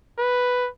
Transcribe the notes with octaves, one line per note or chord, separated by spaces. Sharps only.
B4